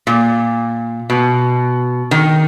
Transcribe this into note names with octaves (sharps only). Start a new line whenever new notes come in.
A#2
B2
D#3